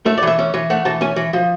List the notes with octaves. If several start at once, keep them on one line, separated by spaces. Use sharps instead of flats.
A3 E5
D5
E3 E5
C#4
E3
A3 F#5
E3 A5
C#4 G#5
E3
F3